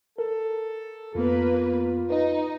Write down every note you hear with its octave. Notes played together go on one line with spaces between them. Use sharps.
A4 A#4
F2 A#3 B3 F4 B4
D#4 B4 D#5